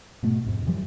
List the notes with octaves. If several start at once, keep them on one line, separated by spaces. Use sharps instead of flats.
G#2 B2 A3
F2 G#2 C3
F#2 E3 F3 G3